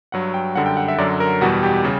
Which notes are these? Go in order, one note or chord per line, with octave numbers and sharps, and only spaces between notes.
G2 F#3 F#5
G5
F#2 D3 G3 F#5
G5
F#5
E5
F#2 D3 F#3 D5
A#4
E2 B2 G3 F#4
G4
C#3 G3